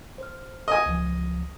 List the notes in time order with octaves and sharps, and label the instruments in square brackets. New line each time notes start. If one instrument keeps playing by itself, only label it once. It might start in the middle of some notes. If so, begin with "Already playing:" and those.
[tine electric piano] C5 F6
[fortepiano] D#5 G#5
[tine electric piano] C#2 F3